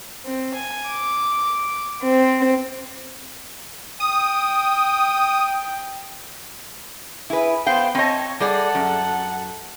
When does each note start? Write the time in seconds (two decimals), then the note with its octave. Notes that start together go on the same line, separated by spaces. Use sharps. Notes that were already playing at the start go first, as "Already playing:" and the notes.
0.25 C4
0.55 G#5
0.88 D6
2.03 C4
4.00 G5 D#6
7.30 E4 G#4 B4
7.66 B3 C5 F5 G5
7.95 C4 C#5 D#5 A5
8.40 G3 G#4 A4 D5 F#5
8.75 F#2